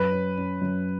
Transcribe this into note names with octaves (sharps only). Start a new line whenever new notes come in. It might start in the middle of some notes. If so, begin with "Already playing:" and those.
Already playing: F#2 B4
C#4
C#4
F#2